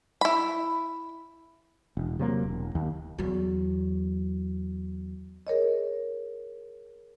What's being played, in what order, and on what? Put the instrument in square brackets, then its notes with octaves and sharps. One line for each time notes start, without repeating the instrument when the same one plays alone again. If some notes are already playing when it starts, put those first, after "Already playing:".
[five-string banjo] E4 B5
[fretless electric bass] E1
C3 F#3 A3 A#3
E1
D#2
[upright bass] E2 F#3
[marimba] G#4 A#4 C#5 D#5